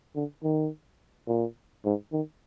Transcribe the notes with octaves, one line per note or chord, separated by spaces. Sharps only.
D3
D#3
A#2
G#2
D#3